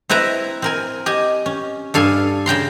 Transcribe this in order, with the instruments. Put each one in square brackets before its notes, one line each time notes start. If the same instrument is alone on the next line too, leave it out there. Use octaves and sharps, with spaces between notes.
[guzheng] C4 E4 B4 E5 A#5
C4 A#4 G#5
G4 D#5 G#5
C#4
G2 A4 F5 G#5
C#3 G5 A#5 C6